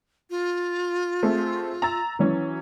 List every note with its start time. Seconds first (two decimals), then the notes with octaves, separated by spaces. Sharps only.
0.30 F4
1.23 A3 C4 G#4
1.82 A#5 E6 A6
2.19 E3 F#3 C#4